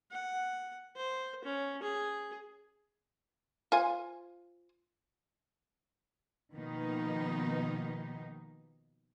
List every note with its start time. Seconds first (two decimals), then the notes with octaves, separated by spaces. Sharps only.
0.11 F#5
0.96 C5
1.45 C#4
1.82 G#4
3.72 F4 C5 G#5
6.54 B2 D#3 F3 A#3 B3 D#4